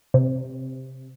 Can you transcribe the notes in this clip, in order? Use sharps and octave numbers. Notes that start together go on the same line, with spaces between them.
C3